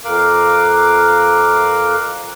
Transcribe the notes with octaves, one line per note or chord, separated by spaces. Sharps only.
F2 A#4 F5 D6 F#6